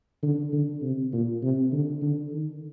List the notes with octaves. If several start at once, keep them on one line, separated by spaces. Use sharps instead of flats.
D3
D3
C3
A#2
C3
D3
D3
D#3